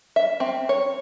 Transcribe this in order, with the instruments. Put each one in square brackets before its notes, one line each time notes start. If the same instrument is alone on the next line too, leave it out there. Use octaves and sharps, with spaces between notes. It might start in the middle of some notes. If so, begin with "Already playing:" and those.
[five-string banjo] E5
C4
C#5